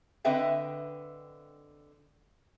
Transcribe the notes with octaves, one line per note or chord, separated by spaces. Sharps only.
D3 C4 B4 D#5 E5 G5